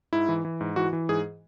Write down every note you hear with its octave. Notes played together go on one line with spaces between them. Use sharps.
G#2 E4
E3
E3
G#2
E3 F#4
E3
G#2 G#4